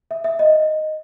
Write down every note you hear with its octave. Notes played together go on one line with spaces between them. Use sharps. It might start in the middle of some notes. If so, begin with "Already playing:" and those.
E5
E5
D#5